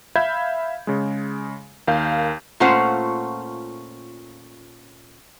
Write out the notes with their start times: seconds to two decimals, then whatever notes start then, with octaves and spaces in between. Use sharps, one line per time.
0.16 E5 F5 B5 G6 G#6
0.87 C#3 G#3
1.88 D#2 A#4 F5 G6
2.60 A#2 A3 C#4 F4 C5 F#5